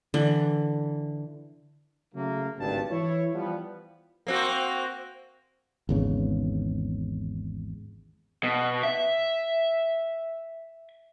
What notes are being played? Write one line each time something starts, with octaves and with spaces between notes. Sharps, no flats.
D3 E3
C#3 F#3 A3 A#3
G#1 D2 G2 A5
E3 E4 C#5
E3 F3 G3 B3
A#3 C4 F#4
G#1 E2 C#3
B2
E5